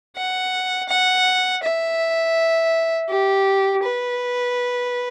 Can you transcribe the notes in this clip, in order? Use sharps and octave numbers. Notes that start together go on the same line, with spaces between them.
F#5
F#5
E5
G4
B4